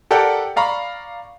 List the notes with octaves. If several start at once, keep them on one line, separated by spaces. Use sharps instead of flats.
G4 A4 A#4 D5 F#5 G5
D5 F5 A#5 B5 C#6